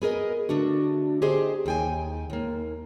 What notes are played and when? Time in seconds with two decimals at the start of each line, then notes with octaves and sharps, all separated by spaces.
0.02 B3 G#4 A#4 D#5
0.49 D3 A3 D4 F#4
1.22 G4 G#4 C5 D#5
1.66 D#2 G5 G#5
2.30 D#2 A#3